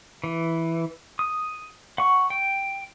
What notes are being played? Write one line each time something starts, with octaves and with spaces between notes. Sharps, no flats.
E3
D#6
F#5 C#6
G5